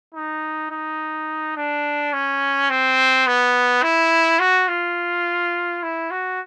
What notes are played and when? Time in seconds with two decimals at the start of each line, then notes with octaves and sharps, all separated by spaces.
0.14 D#4
0.71 D#4
1.56 D4
2.13 C#4
2.70 C4
3.26 B3
3.83 E4
4.40 F#4
4.68 F4
5.82 E4
6.10 F#4